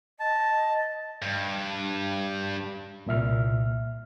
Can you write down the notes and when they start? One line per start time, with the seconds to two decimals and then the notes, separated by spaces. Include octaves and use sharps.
0.20 D#5 A5
1.22 G2
3.06 C2 A#2 E5 F6